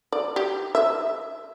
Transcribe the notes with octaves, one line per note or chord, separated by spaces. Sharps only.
D5
G4
E5